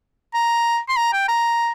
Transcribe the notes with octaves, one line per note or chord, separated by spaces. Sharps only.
A#5
C6
A#5
G5
A#5